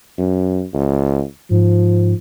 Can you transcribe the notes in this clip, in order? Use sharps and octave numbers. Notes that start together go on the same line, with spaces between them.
F#2
C#2
G#2 F3